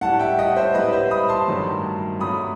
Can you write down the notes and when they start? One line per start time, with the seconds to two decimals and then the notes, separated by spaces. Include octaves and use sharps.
0.01 A2 G3 F#5 A5
0.20 E5 G5
0.39 D#5 F#5
0.56 C5 E5
0.74 A2 G3 B4 D#5
0.92 C5 E5
1.11 B5 D#6
1.29 A5 C6
1.48 G2 D#3 F#3 A3
2.20 G2 F#3 A3 B5 D#6